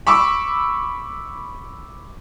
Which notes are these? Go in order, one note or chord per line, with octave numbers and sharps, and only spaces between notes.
B5 C#6 D6 E6